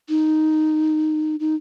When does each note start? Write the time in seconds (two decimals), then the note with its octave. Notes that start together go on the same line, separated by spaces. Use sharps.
0.09 D#4
1.40 D#4